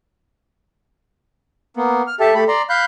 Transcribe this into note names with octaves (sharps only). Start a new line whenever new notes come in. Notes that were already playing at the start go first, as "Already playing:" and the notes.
A#3 B3
F6
G4 A4 E5 A5
A3 G4 A4 B5
D5 A#5 C6
F5 B5 F#6 G6